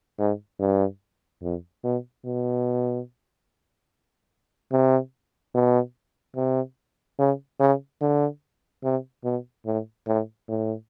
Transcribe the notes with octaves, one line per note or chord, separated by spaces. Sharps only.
G#2
G2
F2
B2
B2
C3
B2
C3
C#3
C#3
D3
C3
B2
A2
A2
A2